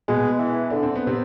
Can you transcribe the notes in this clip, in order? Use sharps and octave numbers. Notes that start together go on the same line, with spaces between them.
B2 G#3 B3
E3
D3 D4
C4
B3
C3 C4